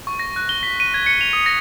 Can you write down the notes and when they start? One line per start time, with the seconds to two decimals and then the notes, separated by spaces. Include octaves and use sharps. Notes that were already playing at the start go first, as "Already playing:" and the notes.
0.07 C#6
0.19 A#6
0.36 F#6
0.49 G7
0.63 B6
0.80 D#7
0.94 G#6
1.06 C#7
1.21 F7
1.33 D#6
1.46 A#6